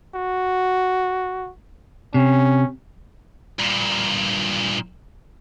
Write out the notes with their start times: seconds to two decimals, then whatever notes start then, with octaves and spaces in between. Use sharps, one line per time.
0.15 F#4
2.14 C3 C#4
3.59 G2 A#2